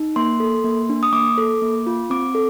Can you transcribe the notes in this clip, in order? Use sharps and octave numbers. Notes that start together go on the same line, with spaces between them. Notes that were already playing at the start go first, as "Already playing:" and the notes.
Already playing: D#4
A#3 C6
A4
A#3
D4
D#6
A#3 D6
A4
A#3
F4
C4 D6
A4